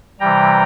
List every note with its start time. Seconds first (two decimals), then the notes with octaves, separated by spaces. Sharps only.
0.20 C3 E3 G3 G5 A#5